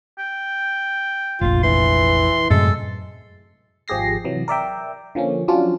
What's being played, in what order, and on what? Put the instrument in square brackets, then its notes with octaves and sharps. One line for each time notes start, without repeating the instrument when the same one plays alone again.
[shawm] G5
[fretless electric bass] F1 A#1 [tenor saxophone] F4
[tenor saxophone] E3 [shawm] C6
[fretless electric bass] F#2 A2 C3 [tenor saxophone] G#3 [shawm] A4
[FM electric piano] G#1 F3 G4 G#4 A#6 C7
C3 E3 F#3
A#4 D5 E5 G5
D3 F3 A#3 C#4
F3 F#3 C#4 D4 F4